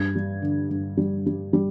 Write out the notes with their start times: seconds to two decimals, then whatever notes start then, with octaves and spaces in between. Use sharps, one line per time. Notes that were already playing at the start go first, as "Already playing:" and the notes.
Already playing: G2 G#6
0.15 G3
0.42 D3
0.71 G2
0.97 G3
1.26 G3
1.53 G3